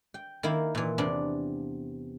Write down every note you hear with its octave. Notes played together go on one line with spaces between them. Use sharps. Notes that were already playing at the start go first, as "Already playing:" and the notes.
G5
D#3 A#3 E4
A#2 E3
E2 C3 B3 D4